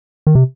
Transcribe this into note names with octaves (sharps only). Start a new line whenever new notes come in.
D#3
C3